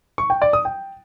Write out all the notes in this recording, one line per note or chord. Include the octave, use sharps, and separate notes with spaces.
C#6
G5
D5
D#6
G5